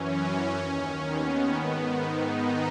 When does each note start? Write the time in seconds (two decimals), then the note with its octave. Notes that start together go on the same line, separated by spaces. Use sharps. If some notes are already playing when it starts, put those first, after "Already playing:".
Already playing: F#2 E3 C#4
0.56 D#2 D#3
1.05 B3
1.53 G#2 D#3
2.00 D#4